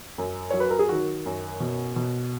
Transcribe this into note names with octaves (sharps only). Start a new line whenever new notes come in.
F#2
F#3 C#5
B4
A#4
G#4
D#3 F#4
F#2
B2
B2